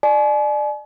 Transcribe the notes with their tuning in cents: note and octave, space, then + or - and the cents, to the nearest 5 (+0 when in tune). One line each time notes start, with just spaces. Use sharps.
D5 +25 G#5 +45